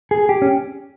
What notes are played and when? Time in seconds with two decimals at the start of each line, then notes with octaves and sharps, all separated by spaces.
0.11 G#4
0.29 G4
0.42 C#4